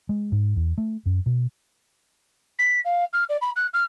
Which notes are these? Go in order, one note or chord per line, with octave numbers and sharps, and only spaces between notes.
G#3
G#2
E2
A3
F#2
B2
B6
F5
F6
D5
B5
F#6
F6